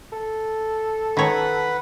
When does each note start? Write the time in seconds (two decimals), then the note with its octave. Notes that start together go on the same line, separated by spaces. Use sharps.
0.13 A4
1.17 D#3 B4 C#5 F#5 B5